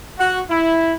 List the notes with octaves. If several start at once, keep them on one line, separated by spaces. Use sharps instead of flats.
F#4
E4